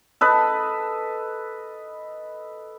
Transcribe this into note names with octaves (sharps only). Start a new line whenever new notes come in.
A4 B4 D#5